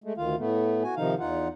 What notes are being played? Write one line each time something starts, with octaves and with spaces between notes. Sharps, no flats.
G#3 A3
D2 D#3 F4 F5
A2 A3 B3
F#4 G#5
C3 D#3 F3 D#4 F5
E2 D#4 F4 F#5